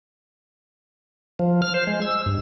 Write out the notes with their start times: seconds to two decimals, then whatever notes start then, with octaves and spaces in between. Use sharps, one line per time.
1.39 F3
1.62 F6
1.74 C5
1.87 G#3
2.02 E6
2.26 G2